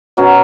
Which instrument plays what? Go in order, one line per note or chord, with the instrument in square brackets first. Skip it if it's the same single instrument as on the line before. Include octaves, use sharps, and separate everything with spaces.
[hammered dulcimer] B2 F#3 C#4